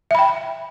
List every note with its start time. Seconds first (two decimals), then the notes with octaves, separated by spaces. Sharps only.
0.11 E5
0.15 B5
0.19 G5